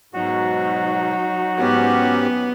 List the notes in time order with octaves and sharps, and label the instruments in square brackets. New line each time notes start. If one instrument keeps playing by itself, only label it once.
[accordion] G#2 B2 [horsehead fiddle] F#3 D#4 [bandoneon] F#4
[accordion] G#2 C#4 G4 [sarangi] B3